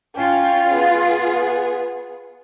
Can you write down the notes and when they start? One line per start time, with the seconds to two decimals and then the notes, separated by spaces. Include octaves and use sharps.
0.16 C#4 F4 G5
0.72 B3 G#4